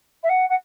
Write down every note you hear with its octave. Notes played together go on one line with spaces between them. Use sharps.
E5
F#5
F#5